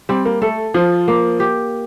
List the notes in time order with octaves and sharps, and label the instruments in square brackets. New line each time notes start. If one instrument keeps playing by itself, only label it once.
[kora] G3 [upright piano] C4
[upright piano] A#3
[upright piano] A3 [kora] A4
[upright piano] F3 [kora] F4
[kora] A#3
G4